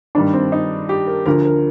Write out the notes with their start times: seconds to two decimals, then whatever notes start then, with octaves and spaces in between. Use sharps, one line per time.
0.15 G2 D#3 G3 D4
0.33 C4
0.52 D#4
0.89 G4
1.07 A#4
1.26 D2 D3 F3 A#4
1.45 A#4